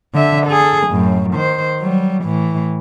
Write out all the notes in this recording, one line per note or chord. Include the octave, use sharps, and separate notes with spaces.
D3 E5
G#4 A4
F#2 A2
D#3 C5
F#3 G3
A2 E3